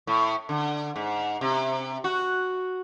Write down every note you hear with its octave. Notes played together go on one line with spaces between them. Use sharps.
A2
D3
G#2
C3
F#4